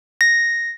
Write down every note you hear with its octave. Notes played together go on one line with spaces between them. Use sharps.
A#6